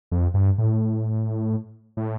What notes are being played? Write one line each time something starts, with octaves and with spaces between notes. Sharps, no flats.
F2
G2
A2
A2